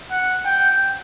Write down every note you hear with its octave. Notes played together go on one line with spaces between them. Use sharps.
F#5
G5